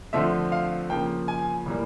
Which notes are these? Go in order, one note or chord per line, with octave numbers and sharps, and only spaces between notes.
D3 F3 A3 C4 E5
F5
C#3 F3 A#3 G5
G#5
A2 E3 G3 A#3